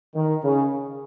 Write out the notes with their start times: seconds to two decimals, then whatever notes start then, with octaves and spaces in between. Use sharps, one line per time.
0.15 D#3
0.43 C#3